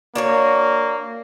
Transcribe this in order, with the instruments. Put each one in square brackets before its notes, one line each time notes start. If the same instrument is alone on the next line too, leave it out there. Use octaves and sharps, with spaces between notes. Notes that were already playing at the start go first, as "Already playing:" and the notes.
[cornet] A#3 [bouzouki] D4 F#4 C#5